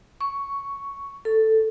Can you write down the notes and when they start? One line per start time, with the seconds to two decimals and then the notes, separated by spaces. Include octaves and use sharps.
0.21 C#6
1.25 A4